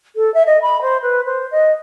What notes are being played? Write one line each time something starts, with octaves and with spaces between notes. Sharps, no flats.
A4
E5
D#5
B5
C5
B4
C5
D#5